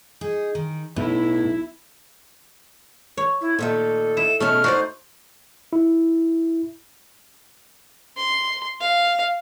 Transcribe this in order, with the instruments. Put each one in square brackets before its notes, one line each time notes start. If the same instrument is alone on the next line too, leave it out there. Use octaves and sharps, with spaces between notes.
[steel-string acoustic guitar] D#4 G#4
D#3
[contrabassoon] B1 [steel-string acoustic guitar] A2 [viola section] E4
[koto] C#5
[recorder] E4
[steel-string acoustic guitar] A#2 D#3 A3 [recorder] A4
[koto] E4 [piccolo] E7
[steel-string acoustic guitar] E2 B2 C#4 [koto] A3 [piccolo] F6
[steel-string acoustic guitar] D#4 C5 [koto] F#4 D5
[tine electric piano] E4
[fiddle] C6
F5